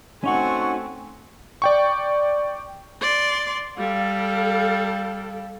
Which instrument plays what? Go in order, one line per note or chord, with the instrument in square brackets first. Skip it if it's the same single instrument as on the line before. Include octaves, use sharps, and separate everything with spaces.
[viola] A3 C4 [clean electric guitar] C#4 D#4 F#4 [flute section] F#5 C#6 [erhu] G#5
[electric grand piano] D5 G5 C#6
[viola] D5 C6
[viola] G3 A4 [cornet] F5